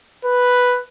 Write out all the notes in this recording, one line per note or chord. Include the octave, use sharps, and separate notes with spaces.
B4